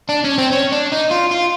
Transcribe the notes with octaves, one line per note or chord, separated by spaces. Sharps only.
D4
C#4
C4
C#4
D4
D#4
F4
F4